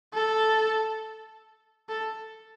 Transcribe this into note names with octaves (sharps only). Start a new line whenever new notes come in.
A4
A4